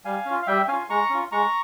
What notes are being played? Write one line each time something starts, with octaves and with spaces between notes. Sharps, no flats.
G3 F5 G#5
C#4
F4
F5
G3 E5 G5
C#4 F4 F5 G#5
G#3 A#5 C#6
C#4 F4
G#3 A#5 C#6